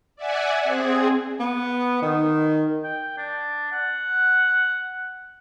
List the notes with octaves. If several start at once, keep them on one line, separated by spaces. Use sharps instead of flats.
D5 E5 F#5 G#5
C4 G#4
B3
D#3
G5
D4
F#5